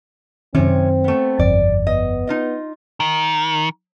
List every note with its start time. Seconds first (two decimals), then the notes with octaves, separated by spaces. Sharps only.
0.55 F#2 C3 D#3 C4 C#4
1.04 A3 B3
1.39 G1 F2 D5
1.87 B3 D#5
2.27 D#4 F4 D#5
3.00 D#3